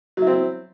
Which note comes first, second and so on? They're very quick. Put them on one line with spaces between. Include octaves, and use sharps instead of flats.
F#3 E4 C4